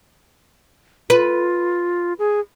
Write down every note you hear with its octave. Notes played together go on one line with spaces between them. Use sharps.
F4 B4
G#4